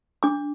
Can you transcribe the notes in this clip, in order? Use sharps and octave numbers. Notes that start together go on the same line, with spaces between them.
D4 D6